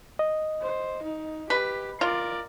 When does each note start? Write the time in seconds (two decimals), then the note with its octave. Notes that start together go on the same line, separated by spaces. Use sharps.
0.19 D#5
0.62 C5
1.03 D#4
1.50 G4 B4
2.01 F4 A#4 D5